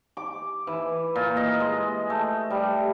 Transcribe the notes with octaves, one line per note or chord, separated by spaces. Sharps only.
D6
E3
A#2
D#5
G#3
A3
G3